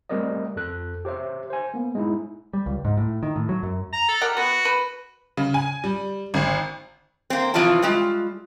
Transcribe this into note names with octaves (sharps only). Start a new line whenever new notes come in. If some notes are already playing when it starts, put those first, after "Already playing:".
G3 A3 C4 A#4 D5 D#5
F2 A4 F#6
G4 C5 C#5 E5
C5 G#5
A#3 B3
G#3 D#4 E4
G3
C#2
G#2
A2
D#3
A2
F#3
F#2
A#5
A4
G4 A#4 F#5
B3 F#4 B4
B4
C#3
G#5
G3
G#1
A#3 C4
C3 E3 F3 F4 C#5 A5
G3 G#3 F4